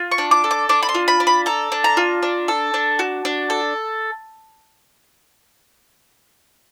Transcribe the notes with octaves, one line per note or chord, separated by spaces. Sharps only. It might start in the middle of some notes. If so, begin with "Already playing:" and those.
Already playing: F4
C#6
D4
D6
A4
D6
D4 D6
B5
C6
F4
B5
D4
B5
A4 A#5
D4
A#5
F4
D4
A4
D4
F#4
D4
A4